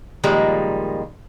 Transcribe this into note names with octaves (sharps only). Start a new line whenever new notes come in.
A#2 D#3 F3 G3 G#3 A#3